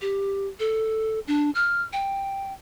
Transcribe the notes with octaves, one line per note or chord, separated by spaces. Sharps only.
G4
A4
D4
F6
G5